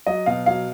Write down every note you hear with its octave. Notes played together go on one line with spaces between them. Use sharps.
F#3 D#5
B2 F5
F#3 F5